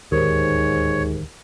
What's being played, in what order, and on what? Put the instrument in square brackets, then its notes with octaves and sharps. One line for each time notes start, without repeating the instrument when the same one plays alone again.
[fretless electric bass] D1 D#2 D#3 [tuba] G#2 [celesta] G4 A#4 C5 [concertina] C#5